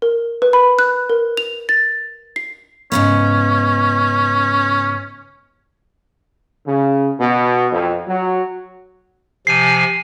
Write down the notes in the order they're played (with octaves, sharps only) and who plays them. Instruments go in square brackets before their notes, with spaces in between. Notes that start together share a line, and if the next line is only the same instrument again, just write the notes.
[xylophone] A#4
B4
B5
F#6
A#4
F7
A6
C7
[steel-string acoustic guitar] G#2 C#3 B3 [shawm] C#4
[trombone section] C#3
B2
F2
F#3
[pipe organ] C3 F3 G#5 [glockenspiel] C7 D#7